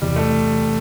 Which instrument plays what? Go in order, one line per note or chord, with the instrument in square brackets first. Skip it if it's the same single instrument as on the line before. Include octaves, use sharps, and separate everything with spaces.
[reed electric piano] E2 C3 E3 [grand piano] G3
[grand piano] A3